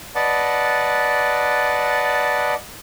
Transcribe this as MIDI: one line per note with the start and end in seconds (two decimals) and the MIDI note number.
0.15 2.54 71
0.15 2.54 74
0.15 2.54 75
0.15 2.54 78
0.15 2.54 81